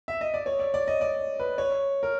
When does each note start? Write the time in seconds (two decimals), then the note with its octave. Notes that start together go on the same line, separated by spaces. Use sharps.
0.08 E5
0.21 D#5
0.34 D5
0.46 C#5
0.60 D5
0.74 D5
0.88 D#5
1.01 D5
1.39 B4
1.58 C#5
2.03 A#4